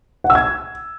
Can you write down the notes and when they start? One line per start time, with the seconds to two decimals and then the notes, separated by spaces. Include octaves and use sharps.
0.24 F#5
0.30 E6
0.35 G#6